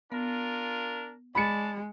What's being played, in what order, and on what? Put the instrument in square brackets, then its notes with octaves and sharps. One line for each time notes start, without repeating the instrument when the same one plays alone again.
[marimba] B3 [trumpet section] D4 F4 A#4
[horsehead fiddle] G#3 [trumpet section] D5 A5 [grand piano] B5 C#7